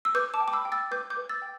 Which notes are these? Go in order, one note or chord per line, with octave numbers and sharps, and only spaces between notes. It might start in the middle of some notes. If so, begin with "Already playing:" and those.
E6
B4 D6 G6
A5 D6
G5
D6
B5 E6
G5
E6 A6
B4 D6 G6
D6 G6
B4
E6 A6
G5